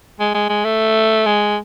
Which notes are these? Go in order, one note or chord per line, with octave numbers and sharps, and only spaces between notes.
G#3
G#3
G#3
A3
G#3